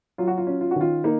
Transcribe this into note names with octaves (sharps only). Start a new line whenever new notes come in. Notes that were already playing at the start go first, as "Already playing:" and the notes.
F#3 F4
F#4
F4
C#4
F4
D#3 F#4
F4
A#3 D#4